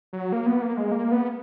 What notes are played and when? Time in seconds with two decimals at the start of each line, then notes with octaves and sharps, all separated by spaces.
0.13 F#3
0.32 A#3
0.46 B3
0.62 A#3
0.77 G#3
0.92 A#3
1.12 B3